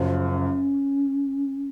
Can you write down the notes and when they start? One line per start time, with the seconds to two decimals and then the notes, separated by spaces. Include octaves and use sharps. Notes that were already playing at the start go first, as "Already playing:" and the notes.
Already playing: F#1 F#2 F3
0.26 C#4